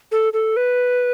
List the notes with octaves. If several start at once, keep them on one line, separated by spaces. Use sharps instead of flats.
A4
A4
B4